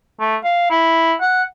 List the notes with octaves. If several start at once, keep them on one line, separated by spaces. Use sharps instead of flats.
A3
F5
E4
F#5